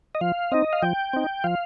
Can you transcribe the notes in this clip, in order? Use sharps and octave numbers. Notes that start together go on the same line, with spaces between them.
D#5
F3 F5
C4 D#4 D#5
F5
F3 G5
C4 D#4
F3 F5